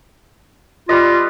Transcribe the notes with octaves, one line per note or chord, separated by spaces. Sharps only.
G3 F4 B4 D#5